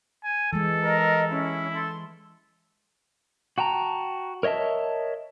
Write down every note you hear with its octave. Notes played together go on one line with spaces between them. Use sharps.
G#5
E3 G#3 A4
A#4 D#5
C#4 E4
A4 C6
F#4 G5 A5 A#5
A#4 C#5 D#5 E5 A5